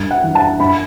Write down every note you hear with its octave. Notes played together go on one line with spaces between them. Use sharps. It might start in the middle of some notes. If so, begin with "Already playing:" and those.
Already playing: G2
F#5
E3
A5
G2 B5